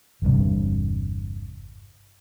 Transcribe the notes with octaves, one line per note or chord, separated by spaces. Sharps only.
G1 E2 G2 C3